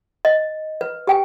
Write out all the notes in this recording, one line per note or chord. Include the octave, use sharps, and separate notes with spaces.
D#5
B4
G4 G5 G#5